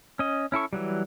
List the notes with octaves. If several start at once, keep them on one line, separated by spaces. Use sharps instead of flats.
C#4 D#5
C#4 E4 A4 C#6
E3 F#3 G3